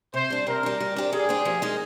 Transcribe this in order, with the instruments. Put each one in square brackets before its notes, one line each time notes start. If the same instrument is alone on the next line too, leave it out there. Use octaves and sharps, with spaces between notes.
[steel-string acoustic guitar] C3 [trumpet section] C5
[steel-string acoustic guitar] G3 D4
[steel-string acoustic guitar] C3 [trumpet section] A#4
[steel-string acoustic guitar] G3 D4
G3
D4 G4 C5
[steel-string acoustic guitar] G3 [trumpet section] G#4
[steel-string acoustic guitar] D4 G4 C5
F3
G#3 D#4 A#4 D#5